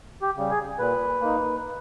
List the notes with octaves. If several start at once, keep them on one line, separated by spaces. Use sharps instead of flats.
G4
C#3 G3
G#4
A#2 B4
A#3 D#4